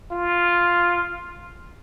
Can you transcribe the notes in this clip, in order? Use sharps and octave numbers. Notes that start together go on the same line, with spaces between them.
F4